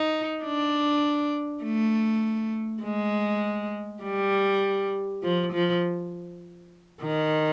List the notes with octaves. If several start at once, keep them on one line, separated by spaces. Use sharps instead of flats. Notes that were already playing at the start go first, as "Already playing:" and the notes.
Already playing: D#4
D4
A3
G#3
G3
F3
F3
D#3